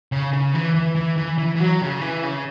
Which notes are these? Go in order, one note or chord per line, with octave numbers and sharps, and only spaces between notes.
C#3
C#3
E3
E3
E3
E3
E3
E3
F#3
C#3
E3
C#3